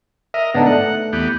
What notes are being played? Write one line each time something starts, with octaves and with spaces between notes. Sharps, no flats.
A#4 D#5 E5
G#2 D3 B3 D4 D#4
A3 F#5
E2 B3 G4